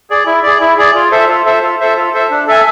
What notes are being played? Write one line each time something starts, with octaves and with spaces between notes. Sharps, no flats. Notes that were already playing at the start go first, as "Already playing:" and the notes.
G#4 D5
E4
G#4 D5
E4
G#4 D5
F4
A4 C5 E5
F4
A4 C5 E5
F4
A4 C5 E5
F4
A4 C5 E5
D4
A4 E5 G#5